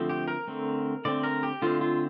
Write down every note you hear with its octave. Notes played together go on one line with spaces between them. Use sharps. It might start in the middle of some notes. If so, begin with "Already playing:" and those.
Already playing: D3 F3 A3 C4
G4
A#4
D3 A3 C4
D3 A3 C4 D5
A#4
G4
D3 A3 C4 F4
F4